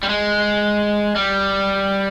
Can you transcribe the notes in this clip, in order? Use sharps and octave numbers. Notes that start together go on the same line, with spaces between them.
G3
G#3
G3